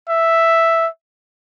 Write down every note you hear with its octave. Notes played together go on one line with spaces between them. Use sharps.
E5